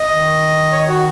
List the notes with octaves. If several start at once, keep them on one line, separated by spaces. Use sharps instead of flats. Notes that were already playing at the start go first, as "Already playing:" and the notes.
Already playing: D#5
D#3
C#5
F#4